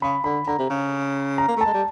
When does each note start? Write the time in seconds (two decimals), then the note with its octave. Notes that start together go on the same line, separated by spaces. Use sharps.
0.02 C#3 B5
0.24 D3 B5
0.47 D3 A#5
0.59 C3
0.70 C#3
1.38 A#5
1.48 A#3
1.57 A3
1.61 A5
1.66 G#3
1.74 G3